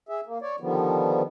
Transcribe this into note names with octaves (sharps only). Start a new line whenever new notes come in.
G#4 E5
A#3
C#5 D5
D3 D#3 F3 G3 B3